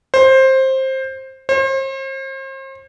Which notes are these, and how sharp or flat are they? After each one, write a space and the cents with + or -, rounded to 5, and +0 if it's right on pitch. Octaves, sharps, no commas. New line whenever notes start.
C5 +15
C5 +40